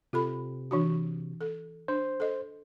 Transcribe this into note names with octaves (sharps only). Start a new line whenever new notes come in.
C3 F4 A4 B5
E3 D4 F#4
A4
D4 C5
A4 D#5